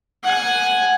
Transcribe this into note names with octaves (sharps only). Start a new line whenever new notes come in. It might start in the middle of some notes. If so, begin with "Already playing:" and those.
F#5 G#5